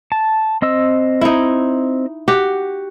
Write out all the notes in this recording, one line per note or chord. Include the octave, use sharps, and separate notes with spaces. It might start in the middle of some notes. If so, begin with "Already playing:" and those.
A5
C4 D#5 E6
D#4 E4
F#4 G4